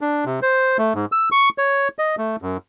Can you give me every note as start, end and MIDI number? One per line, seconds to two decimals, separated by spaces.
0.01 0.25 62
0.25 0.40 48
0.42 0.77 72
0.78 0.93 57
0.95 1.05 44
1.12 1.29 88
1.32 1.49 85
1.58 1.88 73
1.99 2.16 75
2.18 2.36 57
2.42 2.57 42